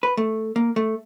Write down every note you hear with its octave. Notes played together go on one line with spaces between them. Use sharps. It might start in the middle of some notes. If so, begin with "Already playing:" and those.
B4
A3
A#3
A3